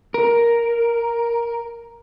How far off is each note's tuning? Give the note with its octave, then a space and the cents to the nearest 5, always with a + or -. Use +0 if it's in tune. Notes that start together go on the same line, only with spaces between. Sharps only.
A#4 +5